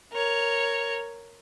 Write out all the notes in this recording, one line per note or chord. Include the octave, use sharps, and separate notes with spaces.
A#4 C#5